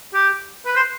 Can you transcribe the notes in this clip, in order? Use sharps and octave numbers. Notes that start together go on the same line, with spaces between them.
G4
B4
C5